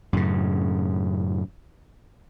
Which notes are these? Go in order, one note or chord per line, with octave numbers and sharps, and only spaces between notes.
F#2 A2 C#3